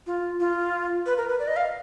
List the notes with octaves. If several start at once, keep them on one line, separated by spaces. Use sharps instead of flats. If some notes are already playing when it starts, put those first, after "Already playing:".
F4
F4
B4
A#4
B4
D5
D#5
F5